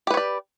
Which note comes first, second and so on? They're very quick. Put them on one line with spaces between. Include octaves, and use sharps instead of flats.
G4 B4 C#5 D5